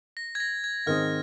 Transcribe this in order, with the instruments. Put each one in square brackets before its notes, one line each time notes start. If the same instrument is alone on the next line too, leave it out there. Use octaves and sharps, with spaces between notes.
[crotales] A#6
G#6
A#6
G#6
[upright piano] G#2 D#3 C4 G#4 D#5 [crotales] F6